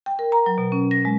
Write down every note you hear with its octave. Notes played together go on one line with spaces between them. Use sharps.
G5
A#4
A#5
F#3
B2
C#4
A#6
G#3